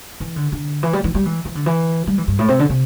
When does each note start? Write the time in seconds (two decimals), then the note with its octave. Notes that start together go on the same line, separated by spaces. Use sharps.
0.20 E3
0.36 D3
0.52 D3
0.83 E3
0.93 G3
1.04 E3
1.14 G3
1.25 E3
1.45 E3
1.55 D3
1.66 E3
2.07 G3
2.18 E3
2.28 G2
2.39 A2
2.48 C3
2.59 D3
2.70 C3